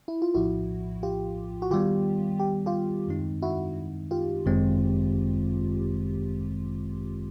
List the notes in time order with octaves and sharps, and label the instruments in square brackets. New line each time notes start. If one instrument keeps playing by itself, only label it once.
[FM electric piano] E4
F4
[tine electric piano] A#1 A2 F3 [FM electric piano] E4 F#4
[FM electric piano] F4 G4
F#4
[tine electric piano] D#3 G3 B3 [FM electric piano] F4 G4
[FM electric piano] G4
F4 G4
[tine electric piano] F#2 D#3 G#3 C4 D#4
[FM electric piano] E4 F#4
F4 G4
[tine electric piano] G1 F#2 D#3 G#3 C4